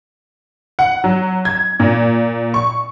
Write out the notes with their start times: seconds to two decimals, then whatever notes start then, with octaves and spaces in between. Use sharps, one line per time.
0.79 F#5
1.04 F#3
1.45 G#6
1.80 A#2
2.54 C#6